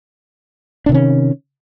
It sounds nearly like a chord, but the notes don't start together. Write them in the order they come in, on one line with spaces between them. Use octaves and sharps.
D4 C3 D#3 C#4